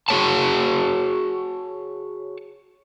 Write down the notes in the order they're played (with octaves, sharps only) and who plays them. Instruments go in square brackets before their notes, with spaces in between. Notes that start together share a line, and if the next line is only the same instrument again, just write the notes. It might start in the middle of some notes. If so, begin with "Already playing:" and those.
[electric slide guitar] F#4 G#4 C#5 A5